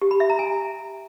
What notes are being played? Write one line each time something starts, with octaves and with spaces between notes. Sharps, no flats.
G4
B5
E5
A#5
G#5